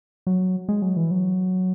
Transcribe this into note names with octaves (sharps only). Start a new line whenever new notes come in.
F#3
G#3
F#3
E3
F#3